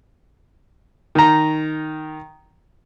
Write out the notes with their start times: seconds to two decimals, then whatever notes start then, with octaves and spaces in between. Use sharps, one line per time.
1.15 D#3 A#5